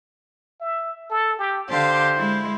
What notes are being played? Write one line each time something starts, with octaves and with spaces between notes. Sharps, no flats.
E5
A4
G4
D3 G4 C5 F5
G#3 E4